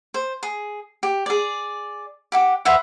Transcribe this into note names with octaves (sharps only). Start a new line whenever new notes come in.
C5
G#4
G4
G#4 D5
G4 F#5 D6
B4 C5 E5 F#5